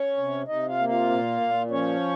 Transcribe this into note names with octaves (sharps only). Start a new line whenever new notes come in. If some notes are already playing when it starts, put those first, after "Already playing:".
Already playing: C#4 C#5
C3
C3 D#4 D#5
F4 F5
A#3
F4 F5
A#2
A#2
F3 C#4 C#5